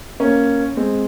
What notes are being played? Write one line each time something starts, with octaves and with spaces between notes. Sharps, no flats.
A#3 C#4
G#3 C4